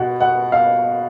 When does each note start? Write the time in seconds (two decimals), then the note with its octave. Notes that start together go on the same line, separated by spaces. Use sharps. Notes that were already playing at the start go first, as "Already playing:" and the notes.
Already playing: B2 F#5
0.20 F#5
0.52 F5